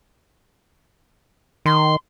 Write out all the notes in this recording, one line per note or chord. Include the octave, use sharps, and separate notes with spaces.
D#3 C6